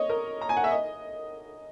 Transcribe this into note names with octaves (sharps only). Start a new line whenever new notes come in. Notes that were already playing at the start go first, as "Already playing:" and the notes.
Already playing: C#5 D#5
A#4
A#5
G#5
F#5
E5
D#5